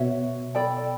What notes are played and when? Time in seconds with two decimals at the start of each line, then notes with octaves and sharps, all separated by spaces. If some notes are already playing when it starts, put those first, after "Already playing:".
Already playing: B2 F#4 C#5 E5
0.55 A4 D5 G5 B5